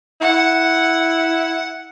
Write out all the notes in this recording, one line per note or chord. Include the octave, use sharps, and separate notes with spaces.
E4 F#5